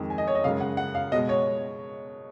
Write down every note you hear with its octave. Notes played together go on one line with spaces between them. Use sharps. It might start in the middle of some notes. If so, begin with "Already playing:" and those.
Already playing: F2 D#3 G#3
G#5
D#5
C#5
D#5
F#2 C#3 G#3 F5
F#5
F#5
F5
B2 G#3 D#5
C#5